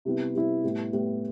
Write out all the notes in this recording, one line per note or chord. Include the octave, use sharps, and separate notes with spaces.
C3 G3 B3 E4
C3 G3 B3 E4
A2 G3 B3
A2 G3 B3